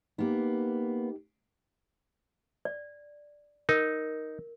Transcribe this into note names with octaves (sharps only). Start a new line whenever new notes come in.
A#3 B3 D#4 G4
D5
D#4 A#4